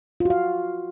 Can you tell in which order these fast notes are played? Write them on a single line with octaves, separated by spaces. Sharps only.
F4 F#4 F5